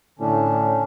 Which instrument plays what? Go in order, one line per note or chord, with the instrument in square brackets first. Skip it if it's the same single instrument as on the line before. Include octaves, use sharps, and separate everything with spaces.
[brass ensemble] A2 D3 [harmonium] C#4 D4